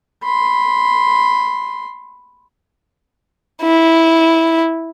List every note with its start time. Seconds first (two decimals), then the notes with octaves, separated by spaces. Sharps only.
0.23 B5 C6
3.63 E4